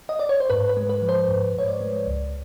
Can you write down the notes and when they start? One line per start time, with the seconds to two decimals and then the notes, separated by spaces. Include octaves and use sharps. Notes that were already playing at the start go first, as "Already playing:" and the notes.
0.09 D#5
0.19 D5
0.29 C#5
0.40 C5
0.50 G#2 B4
0.69 B4
0.77 G#3
0.89 B4
1.02 F3
1.09 C5
1.28 G#2 C5
1.55 G#2 C#5
1.68 D5
1.81 G#3
2.07 C#2